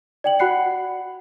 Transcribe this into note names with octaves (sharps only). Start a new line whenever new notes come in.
D5 G5 F#7
F#4 F#5 B5 F#6 C7 C#7